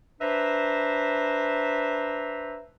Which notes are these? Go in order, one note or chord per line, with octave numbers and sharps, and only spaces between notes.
D4 B4 C5 E5 A#5